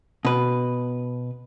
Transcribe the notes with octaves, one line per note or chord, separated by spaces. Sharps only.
B2 B4